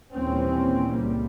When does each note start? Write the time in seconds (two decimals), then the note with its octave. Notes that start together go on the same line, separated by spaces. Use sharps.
0.12 D#2 A#2 E3 G3 C4 C#4
0.91 C#2 G3 A#3